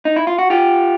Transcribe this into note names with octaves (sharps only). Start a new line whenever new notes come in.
D#4
E4
F4
F#4
F4 G4